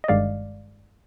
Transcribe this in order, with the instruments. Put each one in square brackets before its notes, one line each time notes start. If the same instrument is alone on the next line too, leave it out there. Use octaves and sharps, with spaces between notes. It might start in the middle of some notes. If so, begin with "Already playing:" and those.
[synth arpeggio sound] D#5
G1 G2 D#3 G#3 D5 F5